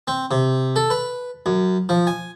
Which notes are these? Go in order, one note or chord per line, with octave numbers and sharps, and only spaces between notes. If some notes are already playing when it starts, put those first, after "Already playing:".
C4
C3
A4
B4
F#2
F3
G#5